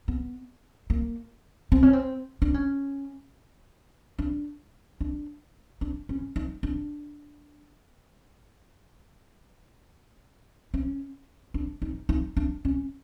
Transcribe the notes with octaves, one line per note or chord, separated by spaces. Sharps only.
B3
A#3
C4
C#4
C4
D4
C#4
D4
D4
D4
C#4
D#4
D4
C#4
D4
D#4
D#4
D4
C#4